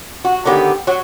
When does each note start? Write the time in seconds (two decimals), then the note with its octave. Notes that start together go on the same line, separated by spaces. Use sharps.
0.25 F#4
0.45 D3 D#3 F#3 B3 G4
0.87 F#3 F#4